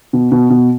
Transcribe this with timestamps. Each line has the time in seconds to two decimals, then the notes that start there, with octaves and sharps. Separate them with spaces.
0.13 B2
0.32 B2
0.50 B2